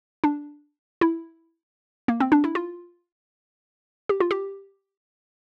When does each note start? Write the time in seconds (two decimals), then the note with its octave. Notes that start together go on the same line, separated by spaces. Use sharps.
0.24 D4
1.01 E4
2.08 A#3
2.20 C4
2.32 D4
2.44 E4
2.55 F4
4.09 G4
4.20 F4
4.31 G4